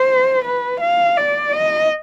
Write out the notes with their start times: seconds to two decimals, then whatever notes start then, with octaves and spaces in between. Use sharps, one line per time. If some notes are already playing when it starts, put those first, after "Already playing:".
Already playing: C5
0.45 B4
0.80 F5
1.17 D5
1.53 D#5